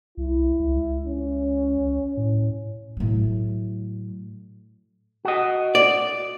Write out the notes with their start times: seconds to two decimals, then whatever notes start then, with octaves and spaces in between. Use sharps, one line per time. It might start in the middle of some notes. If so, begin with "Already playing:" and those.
0.17 C2 E4
0.60 C#2
1.06 C#4
2.17 A2
2.97 A2 F#3
5.25 F#4 D#5
5.75 D5